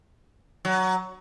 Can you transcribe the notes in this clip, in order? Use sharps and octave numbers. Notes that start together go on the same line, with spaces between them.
F#3